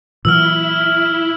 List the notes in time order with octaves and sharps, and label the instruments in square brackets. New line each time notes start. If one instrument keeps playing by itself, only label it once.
[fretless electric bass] A#2 E3 F#3 [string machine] E4 [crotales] E6 F6